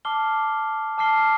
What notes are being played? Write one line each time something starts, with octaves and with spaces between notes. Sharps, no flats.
A5 D6 F6 C7 G7
A5 D6 F6 C7 G7